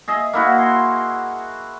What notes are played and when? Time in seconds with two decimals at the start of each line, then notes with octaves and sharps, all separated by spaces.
0.08 G#4 D#5 E5
0.33 A#3 E4 F#4
0.58 C6